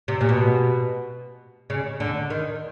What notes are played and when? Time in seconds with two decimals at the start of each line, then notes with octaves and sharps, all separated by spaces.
0.08 C3
0.21 A#2
0.29 B2
1.70 C#3
2.00 D3
2.30 D#3